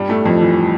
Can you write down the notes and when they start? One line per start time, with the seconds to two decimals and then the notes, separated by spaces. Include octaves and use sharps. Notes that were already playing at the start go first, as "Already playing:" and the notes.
Already playing: G2 G3
0.09 A2 A3
0.25 F2 F3
0.41 E3